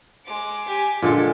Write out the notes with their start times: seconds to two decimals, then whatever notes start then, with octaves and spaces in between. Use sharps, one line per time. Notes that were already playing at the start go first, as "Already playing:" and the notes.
0.25 G#3 D6
0.68 G4 G#5
1.02 A#2 D3 G#3 A4